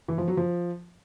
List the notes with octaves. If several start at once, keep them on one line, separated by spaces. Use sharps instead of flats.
E3
F3
F#3
F3